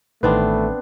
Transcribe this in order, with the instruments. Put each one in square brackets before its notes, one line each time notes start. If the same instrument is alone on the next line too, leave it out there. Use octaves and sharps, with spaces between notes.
[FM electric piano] A1 D#3 E3 [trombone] A3 [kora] B3 C4 D4 [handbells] B4